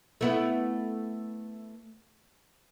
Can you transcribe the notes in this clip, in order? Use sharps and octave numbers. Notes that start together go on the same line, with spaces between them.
A3 B3 E4